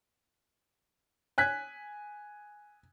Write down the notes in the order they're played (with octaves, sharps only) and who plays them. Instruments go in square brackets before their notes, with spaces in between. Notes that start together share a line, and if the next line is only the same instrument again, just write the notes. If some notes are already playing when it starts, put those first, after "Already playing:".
[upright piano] G#5 F#6 G#6 B6